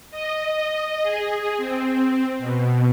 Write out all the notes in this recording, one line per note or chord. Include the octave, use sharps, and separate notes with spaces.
D#5
G#4
C4
B2